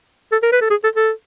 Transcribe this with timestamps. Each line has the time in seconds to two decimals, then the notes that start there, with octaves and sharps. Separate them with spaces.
0.32 A4
0.43 A#4
0.52 B4
0.61 A4
0.70 G#4
0.84 A4
0.96 A4